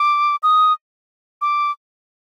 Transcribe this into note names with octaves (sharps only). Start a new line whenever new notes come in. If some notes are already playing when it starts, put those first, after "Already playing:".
Already playing: D6
D#6
D6